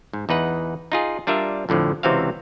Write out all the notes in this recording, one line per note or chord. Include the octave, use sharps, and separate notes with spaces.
G#2
E2 D#4 B4 F#5
D#4 F4 G#4
G3 D4 F4 A#4 E5
F2 A2 D3 F3
C#2 C3 E3 C4 F#4 F5